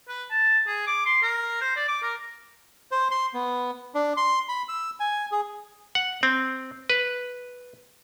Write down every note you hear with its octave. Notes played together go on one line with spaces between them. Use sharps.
B4
A5
G#4
D6
C6
A#4
C5
D5
D6
A#4
C5
C6
B3
D4
C6
B5
E6
G#5
G#4
F#5
C4
B4